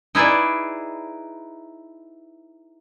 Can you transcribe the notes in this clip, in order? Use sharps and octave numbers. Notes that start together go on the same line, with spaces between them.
D#4 E4 G#4 B4 D5